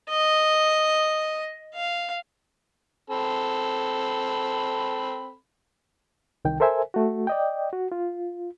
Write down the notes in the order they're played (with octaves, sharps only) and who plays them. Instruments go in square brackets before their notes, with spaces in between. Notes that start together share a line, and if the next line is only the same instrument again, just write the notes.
[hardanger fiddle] D#5
F5
[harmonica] C4 A4 B5
[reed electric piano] C2 D#3 G5
A4 A#4 C5 E5 G#5
A3 F#4
D5 D#5 G5
F#4
F4